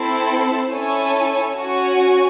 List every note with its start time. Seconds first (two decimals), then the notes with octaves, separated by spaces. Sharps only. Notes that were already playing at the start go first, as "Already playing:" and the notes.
Already playing: C4 E4 A4 C5
0.71 C#4 E4 A4 C#5 G#5
1.56 C#4 F#4 C#5 G#5